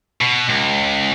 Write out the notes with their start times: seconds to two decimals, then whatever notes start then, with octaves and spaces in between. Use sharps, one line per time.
0.21 B2
0.49 C#2